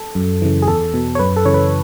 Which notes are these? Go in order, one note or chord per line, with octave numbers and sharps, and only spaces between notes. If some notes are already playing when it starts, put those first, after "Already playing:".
Already playing: A4
F#2
C#3 E3
G#4
E2 A4
B2
C#5
F#2 B4
A4
C#3 E3 C#5
B4